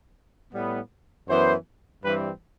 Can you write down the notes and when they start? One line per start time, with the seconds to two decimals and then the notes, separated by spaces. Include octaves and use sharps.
0.53 A2 G3 B3
1.28 F#2 E3 B3 C5
2.03 G2 E3 G3 C4 B4